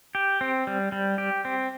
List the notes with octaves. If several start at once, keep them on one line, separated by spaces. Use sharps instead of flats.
G4
C4
G3
G3
G4
C4